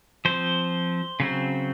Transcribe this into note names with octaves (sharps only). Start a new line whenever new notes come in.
F3 C4 C5
C#3 F#3 C4